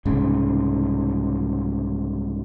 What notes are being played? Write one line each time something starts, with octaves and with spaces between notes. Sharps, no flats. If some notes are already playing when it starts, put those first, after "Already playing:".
C2 G#2 C#3